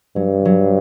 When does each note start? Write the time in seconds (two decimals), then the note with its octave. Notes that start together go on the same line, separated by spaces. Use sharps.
0.16 G2 F#3
0.45 F#3